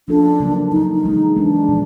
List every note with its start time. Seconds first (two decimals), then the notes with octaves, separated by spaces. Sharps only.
0.08 F3 A#3 C#4 D4 F4 A4
0.40 C#3 F#3 A#3
0.72 C#3 F#3 A#3 D#4
0.92 D#4
1.04 E3 G#3 B3
1.36 E3 G#3 B3 D4
1.68 A#2 F3